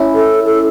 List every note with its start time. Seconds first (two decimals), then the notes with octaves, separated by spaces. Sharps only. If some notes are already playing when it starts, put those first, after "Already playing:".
Already playing: C#4 E4
0.14 A4
0.44 A4